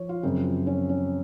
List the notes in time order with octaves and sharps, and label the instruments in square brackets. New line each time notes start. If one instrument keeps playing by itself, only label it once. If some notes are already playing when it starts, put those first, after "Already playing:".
Already playing: [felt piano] F3 C#5
F4
F#2 C#3 F3 C4
C#4
C#4